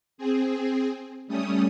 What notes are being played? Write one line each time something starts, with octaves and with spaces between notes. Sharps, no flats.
C4 G#4
G3 A3 C#4 D#6